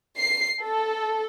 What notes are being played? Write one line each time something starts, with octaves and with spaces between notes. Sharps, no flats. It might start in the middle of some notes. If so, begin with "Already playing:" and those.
C7
A4